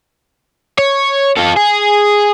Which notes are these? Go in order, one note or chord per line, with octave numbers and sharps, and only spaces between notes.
C#5
F4 A4
G#4